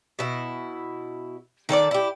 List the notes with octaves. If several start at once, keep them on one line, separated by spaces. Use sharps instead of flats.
B2 E4
D#3 A4 C#5 D5
E4 G4